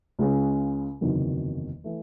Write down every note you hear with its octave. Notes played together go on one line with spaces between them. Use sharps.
C#2 C#3 G#3 C#4
F#1 E2 C3 D#3 F#3
E3 A3